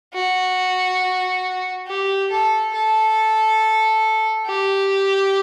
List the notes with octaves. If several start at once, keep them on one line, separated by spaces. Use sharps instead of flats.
F#4
G4
A4
A4
G4